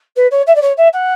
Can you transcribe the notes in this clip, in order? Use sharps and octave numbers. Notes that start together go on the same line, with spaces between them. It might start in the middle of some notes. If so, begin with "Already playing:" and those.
B4
C#5
E5
D5
C#5
E5
F#5